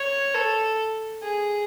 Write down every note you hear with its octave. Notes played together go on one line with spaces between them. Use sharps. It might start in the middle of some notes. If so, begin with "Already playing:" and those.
Already playing: C#5
A4
G#4